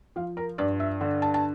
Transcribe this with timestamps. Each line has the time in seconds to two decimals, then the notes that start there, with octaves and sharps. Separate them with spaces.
0.16 F3 F5
0.37 A#4
0.58 G2 D5
0.80 E5
1.01 D3
1.22 A5
1.34 A5